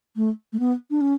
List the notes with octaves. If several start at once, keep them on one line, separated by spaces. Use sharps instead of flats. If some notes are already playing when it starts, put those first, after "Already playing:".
A3
A3
B3
D4
C#4